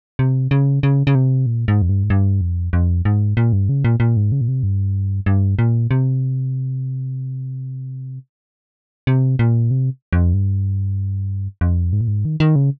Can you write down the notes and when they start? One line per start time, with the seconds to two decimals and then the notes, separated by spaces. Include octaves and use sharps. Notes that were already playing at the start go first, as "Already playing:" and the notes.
0.19 C3
0.51 C#3
0.83 C#3
1.07 C#3
1.15 C3
1.46 A#2
1.68 G#2
1.82 F2
1.89 G2
2.04 G#2
2.10 G2
2.41 F2
2.73 F2
3.05 G#2
3.37 A#2
3.53 G2
3.69 C#3
3.85 A#2
4.00 A#2
4.17 G#2
4.32 C#3
4.41 A#2
4.48 C3
4.63 G2
5.26 G2
5.59 A#2
5.91 C3
9.07 C3
9.39 A#2
9.71 C3
10.13 F2
10.34 G2
11.61 F2
11.93 G#2
12.01 A#2
12.08 G#2
12.25 D#3
12.40 D#3
12.56 C#3